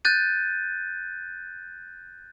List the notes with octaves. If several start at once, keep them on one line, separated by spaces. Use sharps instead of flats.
F#6 G6 A6 D#7